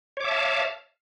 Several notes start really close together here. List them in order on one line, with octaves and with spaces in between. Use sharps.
C#5 D6 E5 A5 F5